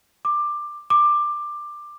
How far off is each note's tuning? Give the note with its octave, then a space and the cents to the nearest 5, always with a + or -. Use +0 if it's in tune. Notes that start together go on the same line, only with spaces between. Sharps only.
D6 +15
D6 +15